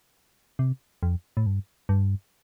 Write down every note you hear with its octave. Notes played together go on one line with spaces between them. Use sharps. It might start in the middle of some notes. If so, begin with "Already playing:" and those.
C3
F2
A2
G2
G2